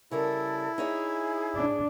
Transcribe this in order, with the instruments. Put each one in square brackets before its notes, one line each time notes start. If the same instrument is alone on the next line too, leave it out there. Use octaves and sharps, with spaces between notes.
[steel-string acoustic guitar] C#3 G3 A#4 [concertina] E4 [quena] A4
[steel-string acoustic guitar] D#4 C#5 E5 [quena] G#4
[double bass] D4